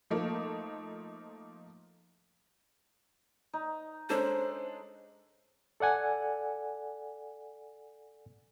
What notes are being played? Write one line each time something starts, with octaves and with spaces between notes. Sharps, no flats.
F3 A3 A#3 D#4
D#4
G#3 C#4 D4 A4 C5
A4 D5 F#5 G#5